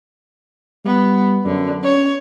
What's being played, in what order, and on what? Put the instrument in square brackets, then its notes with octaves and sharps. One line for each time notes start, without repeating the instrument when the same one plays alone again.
[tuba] G3 [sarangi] B3
[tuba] F#2 [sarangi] D3
[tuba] C#4 [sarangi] C#5